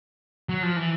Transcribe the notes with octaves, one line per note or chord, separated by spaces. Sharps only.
F#3
F3
E3